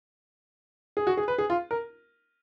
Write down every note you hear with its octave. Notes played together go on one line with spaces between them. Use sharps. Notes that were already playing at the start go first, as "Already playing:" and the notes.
G#4
F#4
G#4
B4
G#4
F4
A#4